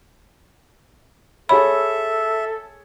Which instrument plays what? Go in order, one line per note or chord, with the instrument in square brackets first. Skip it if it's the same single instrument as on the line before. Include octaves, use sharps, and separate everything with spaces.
[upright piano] G#4 C#5 [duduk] A4 [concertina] E5 [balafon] B5